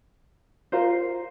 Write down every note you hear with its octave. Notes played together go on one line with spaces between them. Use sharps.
F4 A#4 C5